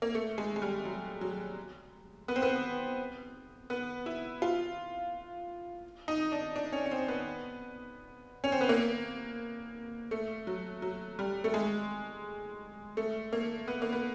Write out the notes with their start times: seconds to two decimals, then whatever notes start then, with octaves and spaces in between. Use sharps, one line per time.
0.02 A#3
0.15 A3
0.38 G#3
0.56 G#3
0.62 G3
0.85 F#3
1.21 F#3
2.28 B3
2.36 C4
2.42 B3
3.70 B3
4.06 E4
4.42 F4
6.08 D#4
6.32 D4
6.56 D4
6.72 C#4
6.86 C#4
6.91 C4
7.08 B3
8.44 C#4
8.52 C4
8.61 B3
8.69 A#3
10.11 A3
10.47 F#3
10.82 F#3
11.19 G3
11.44 A3
11.54 G#3
12.97 A3
13.33 A#3
13.68 B3
13.82 A#3
13.92 B3